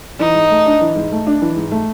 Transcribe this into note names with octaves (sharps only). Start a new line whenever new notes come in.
E3 D#4
G#2
A3
D4
E3
G#2
A3
D4
E3
G#2
A3